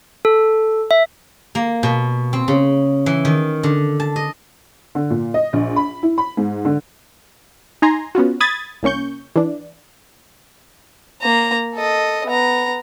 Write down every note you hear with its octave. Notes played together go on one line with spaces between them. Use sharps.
A4
E5
A#3
B2
C4
C#3
E3
D#3
D3
A5
D#5
D3
A#2
D#5
A#1
B5
E4
B5
G#2
D3
D#4 G#5 A#5 C6
B3 C#4 F4 F#4
B5 D#6 G#6 A6
C2 A#3 C#4 C#6 G6
E3 D4
A#3 A#5
A4 D#5
B3 A#5